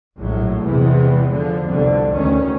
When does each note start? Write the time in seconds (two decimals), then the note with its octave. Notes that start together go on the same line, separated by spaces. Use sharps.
0.17 A#1 A2 F#3
0.64 E2 C3 E3 G#3 B3
1.31 D3 F3
1.67 C2 F2 B2 D3
2.14 D2 D#3 C#4